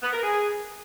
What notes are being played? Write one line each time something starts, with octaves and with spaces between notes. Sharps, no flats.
B3
A#4
G#4